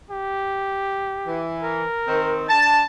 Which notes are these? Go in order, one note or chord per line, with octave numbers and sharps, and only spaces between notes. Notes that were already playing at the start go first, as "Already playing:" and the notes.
G4
E3
A#4
D#3 C4
D4 A5